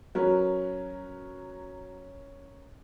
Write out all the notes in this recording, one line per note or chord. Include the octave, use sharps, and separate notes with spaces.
F#3 C#4 A#4 B4